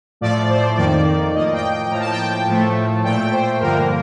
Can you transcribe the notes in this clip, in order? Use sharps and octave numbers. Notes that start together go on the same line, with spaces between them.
A2 F3 A3 D5
C5
F2 D#3 A#3 D5
A2 F3 A#3 D#5
G5
G5
A2 F3 A#3 A#5
A5
G5
A5
A2 F3 A3
A#2 A3 G5
C5
G2 D3 F3 A#3 A#4